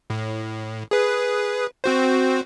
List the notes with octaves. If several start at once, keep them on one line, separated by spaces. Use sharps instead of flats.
A2
G#4 B4
C4 F#4 C5